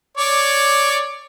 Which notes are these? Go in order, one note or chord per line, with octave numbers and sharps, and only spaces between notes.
C#5 D5 D6